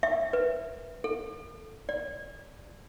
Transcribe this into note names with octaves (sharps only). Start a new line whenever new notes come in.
E5
B4
A4
D5